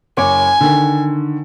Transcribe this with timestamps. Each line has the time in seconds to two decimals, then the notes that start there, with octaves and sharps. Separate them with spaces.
0.17 F#1 C#5 G#5 D6
0.61 D3 D#3